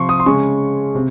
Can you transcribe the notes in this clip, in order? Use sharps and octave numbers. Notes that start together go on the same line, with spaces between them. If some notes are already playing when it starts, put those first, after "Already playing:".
Already playing: C3 F3 C4 C6 C#6
D#6
C6
C#3 G#3 C#4 C#6
C3